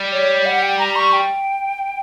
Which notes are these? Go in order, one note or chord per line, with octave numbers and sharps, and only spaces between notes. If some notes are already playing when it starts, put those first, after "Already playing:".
Already playing: G3
C#5
F#5
G5
A#5
C#6
G5